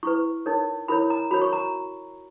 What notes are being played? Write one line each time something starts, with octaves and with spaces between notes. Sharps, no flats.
E4 B4 C#6
D#4 A#4 C#5
E4 A#4 C#5 B5
A#5
F#4 A#4 C#5 B5
C#6
A#5